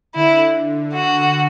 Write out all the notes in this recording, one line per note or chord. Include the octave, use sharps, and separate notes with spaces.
D3 E4
D3 F#4